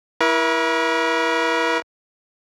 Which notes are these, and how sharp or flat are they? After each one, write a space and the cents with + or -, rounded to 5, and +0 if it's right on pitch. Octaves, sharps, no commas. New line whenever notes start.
E4 +0 A#4 +45 C#6 +35